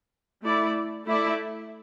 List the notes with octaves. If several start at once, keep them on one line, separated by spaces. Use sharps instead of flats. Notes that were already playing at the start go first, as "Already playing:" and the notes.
A3 E4 D5
A3 E4 D5